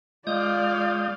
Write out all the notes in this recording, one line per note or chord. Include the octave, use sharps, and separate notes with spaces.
G#3 F4 D5 F5 D#6 G6